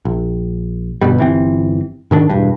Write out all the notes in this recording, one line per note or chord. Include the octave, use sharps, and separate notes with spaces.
A#1
G1 G2 B2 G3
G1 E3 C4
G#2 D#3 C#4 D4
E1 G2